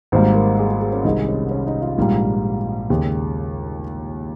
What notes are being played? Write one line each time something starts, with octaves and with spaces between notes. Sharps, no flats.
G#1 G#2 G3 A#3 C5
A#4
G#4
G#4
G#4
C#4
C2 C3 D#3 G#3 D#4
C#4
C#4
D#4
F4
A#1 G#2 G3 A#3
D#2 C#3 G#3 G4